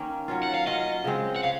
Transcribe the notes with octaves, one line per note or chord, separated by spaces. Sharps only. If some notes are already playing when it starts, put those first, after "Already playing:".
Already playing: D#3 A#3 C#4
F#3 C#4 F4
F#5
F5
F#3 C#4 F4 D#5
C#3 G#3 C4
F#5
C#3 F5